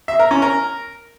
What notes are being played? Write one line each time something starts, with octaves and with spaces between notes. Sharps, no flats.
E5
A#4
C#4
A#4